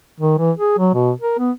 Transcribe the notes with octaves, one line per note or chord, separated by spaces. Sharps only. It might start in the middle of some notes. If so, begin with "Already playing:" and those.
D#3
E3
G#4
F#3
B2
A#4
B3